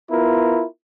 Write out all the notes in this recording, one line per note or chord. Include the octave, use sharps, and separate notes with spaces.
B3 E4 F4 A#4